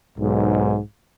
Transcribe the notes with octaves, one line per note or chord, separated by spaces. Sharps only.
B1 G#2